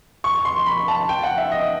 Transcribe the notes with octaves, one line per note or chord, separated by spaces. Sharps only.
C#6
C6
B5
A5
G5
F#5
E5
D#5